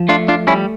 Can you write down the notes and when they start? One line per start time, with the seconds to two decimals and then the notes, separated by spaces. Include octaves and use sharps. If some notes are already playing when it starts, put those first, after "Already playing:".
Already playing: F3
0.09 A3 D4 F4
0.28 D4 F4
0.47 G3 C#4 E4